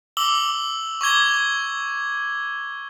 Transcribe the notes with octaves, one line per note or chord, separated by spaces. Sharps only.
D6 E6 F#7 G7
C#6 D6 G#6 G7